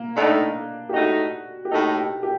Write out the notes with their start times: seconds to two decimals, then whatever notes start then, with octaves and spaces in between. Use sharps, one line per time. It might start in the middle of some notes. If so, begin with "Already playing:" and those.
Already playing: A#3
0.16 A2 A3 D4 D#4
0.89 G4
0.93 A2 A3 D#4 F#4
1.65 G4
1.71 A2 A3 D#4 A4
1.97 G4
2.23 G4